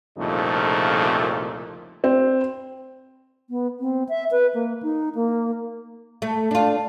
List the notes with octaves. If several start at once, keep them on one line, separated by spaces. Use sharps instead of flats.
C2 F2 A#2 C#3 A3 D#4
C4
B3
C4
E5
B4
A#3
D#4
A#3
A3
D4 F4